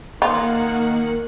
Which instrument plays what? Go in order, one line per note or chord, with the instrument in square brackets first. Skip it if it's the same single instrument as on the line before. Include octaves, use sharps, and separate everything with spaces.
[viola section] D#3 A#3 F#5 [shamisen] F4